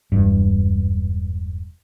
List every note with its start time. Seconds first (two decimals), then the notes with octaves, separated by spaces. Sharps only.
0.12 E1 G2